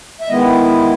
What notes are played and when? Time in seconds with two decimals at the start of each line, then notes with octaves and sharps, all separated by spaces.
0.21 E5
0.28 D#3 G#3 B3 E4 D#5